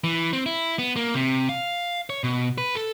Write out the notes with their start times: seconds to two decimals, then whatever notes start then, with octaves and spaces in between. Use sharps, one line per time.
0.04 E3
0.33 C4
0.46 E4
0.79 B3
0.96 A#3
1.15 C3
1.49 F5
2.10 C#5
2.24 B2
2.58 B4
2.75 A4